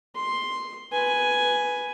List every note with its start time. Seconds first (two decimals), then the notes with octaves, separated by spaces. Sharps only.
0.16 C6
0.93 B4 G#5